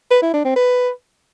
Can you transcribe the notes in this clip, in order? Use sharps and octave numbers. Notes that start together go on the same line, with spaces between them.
B4
E4
D4
C4
B4